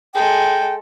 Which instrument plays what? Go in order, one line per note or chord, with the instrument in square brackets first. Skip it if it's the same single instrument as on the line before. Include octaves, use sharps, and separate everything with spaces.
[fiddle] G#3 A4 [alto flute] G5